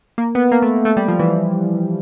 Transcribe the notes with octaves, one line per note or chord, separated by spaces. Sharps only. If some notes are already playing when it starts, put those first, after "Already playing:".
A#3
B3
A#3
A3
A3
G3
F3
E3